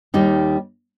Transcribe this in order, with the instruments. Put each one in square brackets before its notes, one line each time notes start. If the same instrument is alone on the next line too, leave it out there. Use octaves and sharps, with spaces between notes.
[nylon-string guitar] D#2 D#3 G3 A#3 D#4